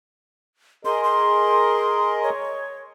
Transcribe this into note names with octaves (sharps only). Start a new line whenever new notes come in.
G#4 A#4 D#5 C6
C6
C#5